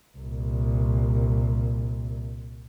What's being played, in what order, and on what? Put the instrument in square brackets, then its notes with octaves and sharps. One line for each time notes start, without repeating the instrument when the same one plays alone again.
[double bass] C2 A#2